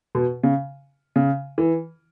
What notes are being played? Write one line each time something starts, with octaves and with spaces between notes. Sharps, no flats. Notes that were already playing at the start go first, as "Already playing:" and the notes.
B2
C#3
C#3
E3